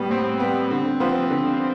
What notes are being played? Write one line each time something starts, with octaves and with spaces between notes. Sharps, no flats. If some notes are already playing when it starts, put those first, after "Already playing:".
Already playing: A2 G3 B3
A2 C4
G3 B3
D3 C4
F3 B3 F4 C5
D3